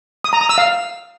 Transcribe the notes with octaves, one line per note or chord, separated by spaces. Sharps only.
D#6
A#5
D#6
E6
F5